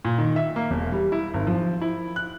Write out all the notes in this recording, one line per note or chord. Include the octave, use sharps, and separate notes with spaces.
A#2
D#3
E5
A#3
E1
G3
E4
G#1
F3
E4
F#6